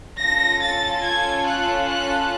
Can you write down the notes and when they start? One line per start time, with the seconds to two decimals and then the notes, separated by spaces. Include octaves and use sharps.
0.19 C#4 F4 A4 A#6
0.60 A6
1.03 G#6
1.46 F#6
1.87 F#6